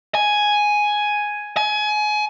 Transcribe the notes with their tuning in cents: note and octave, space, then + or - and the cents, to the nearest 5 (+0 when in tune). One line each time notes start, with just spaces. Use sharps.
G#5 +5
G#5 +25